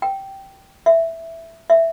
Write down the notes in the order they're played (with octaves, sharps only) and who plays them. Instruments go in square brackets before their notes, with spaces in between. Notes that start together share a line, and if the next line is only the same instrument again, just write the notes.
[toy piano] G5
E5
E5